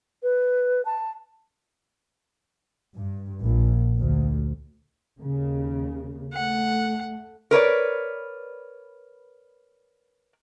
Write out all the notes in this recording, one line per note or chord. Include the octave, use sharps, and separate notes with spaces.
B4
A5
G2
A#1
D2
D#2 C#3
A3 F#5
A#4 B4 C#5 D5